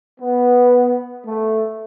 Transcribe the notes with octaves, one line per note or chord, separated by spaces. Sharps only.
B3
A3